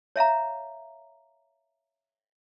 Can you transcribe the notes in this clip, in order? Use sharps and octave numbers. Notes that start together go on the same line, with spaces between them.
C#5 E5 F5 A#5